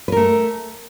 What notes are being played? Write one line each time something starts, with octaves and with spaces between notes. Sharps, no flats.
A3 A#4 B4